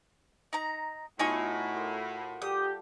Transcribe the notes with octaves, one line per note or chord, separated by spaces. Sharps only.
D#4 A#5
A2 B3 D#4 F4 F#4 G#5 C#6
A#4 C6 D#6
G3 G4 A4 D#6